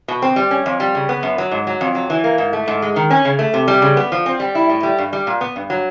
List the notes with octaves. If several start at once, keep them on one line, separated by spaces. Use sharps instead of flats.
B2
C4
G3
C#4
F2
G3
C#3
B3
F#2
F#3
G#2
F#3
F2
F#3
E3
A#3
G#2
A3
G#2
G#3
D#3
C#4
C#3
A3
C3
G3
C#3
B3
F3
C4
G3
E4
A2
G3
G2
G3
A#2
B3
G2
F#3